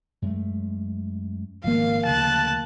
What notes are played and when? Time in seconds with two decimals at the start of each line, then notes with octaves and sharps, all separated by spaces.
0.22 F#2 G#3 A3
1.64 G#1 F3 A#3 F5
2.05 D2 C#3 E3 A5 F#6